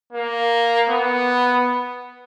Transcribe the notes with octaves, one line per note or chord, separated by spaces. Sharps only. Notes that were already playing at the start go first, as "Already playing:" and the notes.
A#3
B3